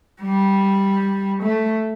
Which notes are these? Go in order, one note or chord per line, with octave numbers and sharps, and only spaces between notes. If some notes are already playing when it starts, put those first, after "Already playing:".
G3
A3